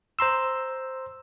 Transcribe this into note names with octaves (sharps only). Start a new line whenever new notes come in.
C5 A#5 C6 E6